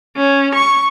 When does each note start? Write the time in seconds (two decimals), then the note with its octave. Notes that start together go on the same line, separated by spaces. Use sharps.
0.16 C#4
0.55 C#6